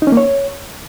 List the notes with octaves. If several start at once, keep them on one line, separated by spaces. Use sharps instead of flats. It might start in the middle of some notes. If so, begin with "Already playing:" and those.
D#4
C#4
A#3
C#5